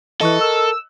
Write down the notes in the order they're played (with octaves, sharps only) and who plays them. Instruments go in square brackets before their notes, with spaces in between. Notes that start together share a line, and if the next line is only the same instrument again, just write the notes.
[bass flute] E3 [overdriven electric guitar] A4 [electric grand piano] D#5 C#6 F#6
[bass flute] A#4 [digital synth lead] E6